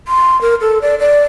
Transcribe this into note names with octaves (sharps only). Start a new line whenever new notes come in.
C6
A#4
A4
D5
D5